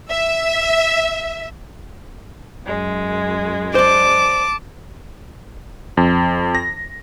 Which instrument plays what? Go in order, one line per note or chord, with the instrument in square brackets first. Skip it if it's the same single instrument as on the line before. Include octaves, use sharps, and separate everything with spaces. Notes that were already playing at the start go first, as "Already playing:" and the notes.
[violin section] E5
[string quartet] F#2 G#3
[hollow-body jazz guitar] C5 D5 [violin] A5 D6
[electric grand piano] F2
A#6